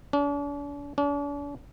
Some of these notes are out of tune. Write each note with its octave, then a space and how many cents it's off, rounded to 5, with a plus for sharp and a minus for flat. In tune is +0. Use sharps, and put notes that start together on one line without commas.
D4 -45
D4 -45